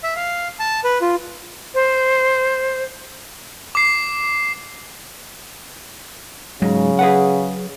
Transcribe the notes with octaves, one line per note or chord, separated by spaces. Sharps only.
E5
F5
A5
B4
F4
C5
D6 C7
G#2 C#3 F#3
G#4 B4 F#5